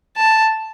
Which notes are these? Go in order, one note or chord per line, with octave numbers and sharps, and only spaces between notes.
A5